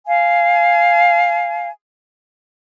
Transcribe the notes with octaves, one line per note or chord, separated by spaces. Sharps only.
F5 G#5